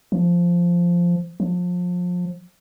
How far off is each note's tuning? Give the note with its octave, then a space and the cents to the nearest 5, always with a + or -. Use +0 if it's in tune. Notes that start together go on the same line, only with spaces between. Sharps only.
F3 -5
F3 +30